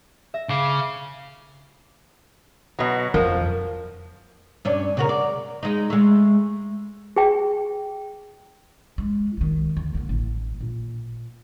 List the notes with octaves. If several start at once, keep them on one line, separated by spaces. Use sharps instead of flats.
E5 A#6
C#3 F5 D6
B2 F#3
F2 F3 A#4
G2 C#4 D4
C#3 F#4 A#4
D5
G#3 D#4
G#3 A3
G#4 G5
G#3
C2 D#3
D2
D3 A#3
A1
A#2